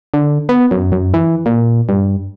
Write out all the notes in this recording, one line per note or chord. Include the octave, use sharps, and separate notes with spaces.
D3
B3
F#2
F#2
E3
A#2
G2